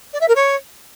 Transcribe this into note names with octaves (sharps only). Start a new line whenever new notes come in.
D5
E5
A#4
C#5